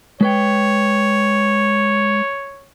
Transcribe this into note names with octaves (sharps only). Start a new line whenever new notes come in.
G#3 B4 C#5 G5